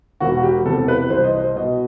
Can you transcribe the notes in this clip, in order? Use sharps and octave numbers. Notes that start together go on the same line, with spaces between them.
E1 F#4
F#4
G4
E2 C3 A4
B4
C2 C5
D#5
C5
B2 D#5